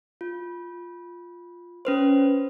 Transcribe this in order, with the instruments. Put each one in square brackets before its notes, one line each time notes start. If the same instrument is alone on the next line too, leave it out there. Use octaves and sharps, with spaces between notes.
[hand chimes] F4
C#4 B4 C5